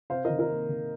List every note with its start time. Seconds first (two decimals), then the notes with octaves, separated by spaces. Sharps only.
0.10 C3 C5 F5
0.25 A#4 D#5
0.30 D#3
0.39 A#4 D#5
0.49 A#3
0.69 D#3